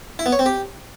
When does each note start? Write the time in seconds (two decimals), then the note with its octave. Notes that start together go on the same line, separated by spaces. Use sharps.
0.19 E4
0.26 B3
0.33 C#5
0.39 C4
0.46 G4